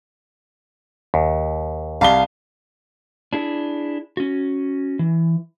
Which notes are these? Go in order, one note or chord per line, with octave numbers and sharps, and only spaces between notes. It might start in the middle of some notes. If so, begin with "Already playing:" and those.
D#2
C2 F5 A5 G7
D4 E4 G#4
C#4 F#4
E3